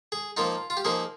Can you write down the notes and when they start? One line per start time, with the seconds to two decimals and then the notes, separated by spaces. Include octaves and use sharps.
0.12 G#4
0.37 F3 A#3 D#4 F4
0.70 F4
0.77 G4
0.85 F3 A#3 D#4 G#4